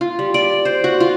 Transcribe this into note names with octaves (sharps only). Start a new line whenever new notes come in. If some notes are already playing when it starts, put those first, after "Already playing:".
F4
G3
D5
C5
F#4
F4